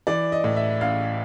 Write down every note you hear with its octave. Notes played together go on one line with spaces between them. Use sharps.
E3 D5
D#5
A2
E5
A1 F5